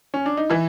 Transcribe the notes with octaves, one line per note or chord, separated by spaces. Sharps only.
C#4
D4
D#4
E3 E4